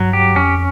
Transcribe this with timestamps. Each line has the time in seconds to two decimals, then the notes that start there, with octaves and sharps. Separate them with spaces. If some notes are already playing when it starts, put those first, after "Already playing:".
Already playing: G2 F#3
0.13 G4
0.35 F2 C#4